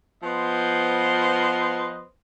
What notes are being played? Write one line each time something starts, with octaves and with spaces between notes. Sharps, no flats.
F3 B3 B4 C5 D#5 C6